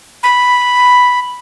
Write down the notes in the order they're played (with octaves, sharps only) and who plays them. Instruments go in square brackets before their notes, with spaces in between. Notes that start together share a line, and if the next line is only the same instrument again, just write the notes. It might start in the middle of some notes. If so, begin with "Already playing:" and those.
[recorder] B5